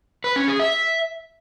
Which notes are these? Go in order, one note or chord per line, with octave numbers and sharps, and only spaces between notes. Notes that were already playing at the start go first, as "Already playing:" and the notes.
B4
C#4
G#4
E5